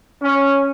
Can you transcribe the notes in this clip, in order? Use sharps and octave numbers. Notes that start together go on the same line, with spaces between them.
C#4